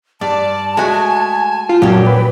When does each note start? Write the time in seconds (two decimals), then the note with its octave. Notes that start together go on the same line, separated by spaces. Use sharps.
0.21 G2 D5 A5
0.77 G#3 A3 F#4 G#5
1.69 F4
1.82 F#2 A#2 F#3 C#4 D4 G4
2.07 B4 G5